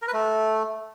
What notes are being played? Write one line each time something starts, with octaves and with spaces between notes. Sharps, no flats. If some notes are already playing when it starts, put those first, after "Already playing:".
A#4
B4
A3